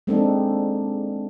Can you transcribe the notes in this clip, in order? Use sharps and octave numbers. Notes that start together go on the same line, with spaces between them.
G#3 A#3 C4 D4 D#4 A4